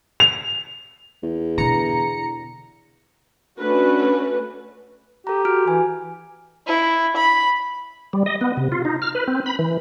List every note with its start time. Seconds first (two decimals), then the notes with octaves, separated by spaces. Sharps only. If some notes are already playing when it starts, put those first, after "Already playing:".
0.20 F7
1.23 E2
1.58 B2 D3 A#5 C#7
3.58 A3 C#4 D4 F#4 B4
5.27 G4 A4 A#5
5.45 F#4 F6 D7
5.68 E3 G#5
6.67 E4
7.16 B5
8.13 G3
8.26 D#5
8.41 B3
8.57 C3
8.72 F4
8.85 D#4
9.02 F6
9.15 B4
9.28 C4
9.46 B5
9.59 E3